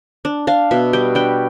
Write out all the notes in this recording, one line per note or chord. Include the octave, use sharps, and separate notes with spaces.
D4
D4 F5
B2 E5
G3 G5
D4 G5